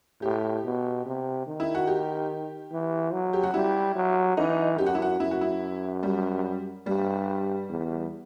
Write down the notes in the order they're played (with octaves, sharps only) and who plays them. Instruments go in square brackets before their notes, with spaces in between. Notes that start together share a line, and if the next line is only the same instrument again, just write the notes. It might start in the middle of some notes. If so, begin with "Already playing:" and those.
[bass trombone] A2 [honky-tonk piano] G4
[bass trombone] B2
C3
D#3
[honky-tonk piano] E4
F#4
G4
[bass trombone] E3
F#3
[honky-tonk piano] G4
F#4
[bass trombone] G3 [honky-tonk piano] E4
[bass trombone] F#3
[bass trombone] E3 [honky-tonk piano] D#4
[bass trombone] F#2 [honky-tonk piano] G4
[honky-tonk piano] F#4
E4
F#4
[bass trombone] F#2 [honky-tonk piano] E4
[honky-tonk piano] F#4
E4
G3
[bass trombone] G2 [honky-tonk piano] G3
[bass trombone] E2